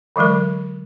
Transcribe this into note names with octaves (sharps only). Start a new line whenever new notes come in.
D3 E3 F#3 G#3 A#4